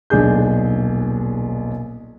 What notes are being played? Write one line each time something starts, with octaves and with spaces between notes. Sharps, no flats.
D#1 B1 D4 G#4 G6